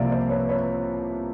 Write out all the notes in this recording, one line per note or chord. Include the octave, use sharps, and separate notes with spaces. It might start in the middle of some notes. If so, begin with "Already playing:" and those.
Already playing: C2 C3 F3 A#3 D5 E5 F5
C5 D5
B4 C#5
B4 C#5